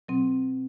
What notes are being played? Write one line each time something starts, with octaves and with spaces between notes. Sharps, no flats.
B2 F#3 C4